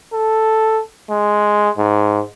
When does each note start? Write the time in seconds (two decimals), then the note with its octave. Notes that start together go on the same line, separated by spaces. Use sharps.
0.13 A4
1.10 G#3
1.78 G#2